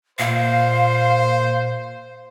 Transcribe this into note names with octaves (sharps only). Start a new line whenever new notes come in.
A#2 C5 F5